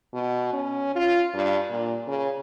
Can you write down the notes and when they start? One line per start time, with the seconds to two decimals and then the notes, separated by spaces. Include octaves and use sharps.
0.13 B2
0.53 C#4
0.95 F4
1.34 G2
1.70 A#2
2.07 C#3